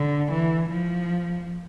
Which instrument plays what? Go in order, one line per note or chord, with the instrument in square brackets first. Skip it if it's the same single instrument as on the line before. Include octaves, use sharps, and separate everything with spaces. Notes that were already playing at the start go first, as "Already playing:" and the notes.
Already playing: [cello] D3
E3
F3